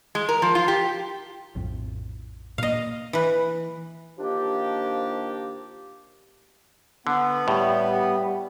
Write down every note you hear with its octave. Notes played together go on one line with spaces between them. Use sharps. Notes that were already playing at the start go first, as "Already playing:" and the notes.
G#3
A#4
F3
F4
G4
A#1 F2 A2
A#2 A#3 D#5 F5
E3 B4
D#3 F3 A#3 D4 G4
D3 B3
A2 G3